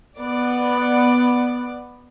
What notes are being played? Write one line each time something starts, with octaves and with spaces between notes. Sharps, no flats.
B3 D5